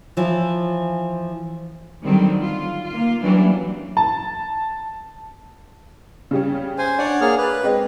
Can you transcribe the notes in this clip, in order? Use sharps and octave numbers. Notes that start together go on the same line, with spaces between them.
E3 F3
D3 D#3 F#3 G3 C4
F4
A#3 F4
E3 F#3 G3 A#3 C#4 D4
A5
C#3 G3 C#4
C5 G#5
D4 C#5 D5 F#5
A#3 G#4 F6
B4
G#3 C4 D#5